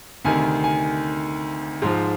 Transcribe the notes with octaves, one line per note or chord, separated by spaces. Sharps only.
D2 C3 D#3 G#5
G#5
G#2 F3